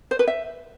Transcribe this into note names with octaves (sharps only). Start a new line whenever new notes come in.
C5
B4
E5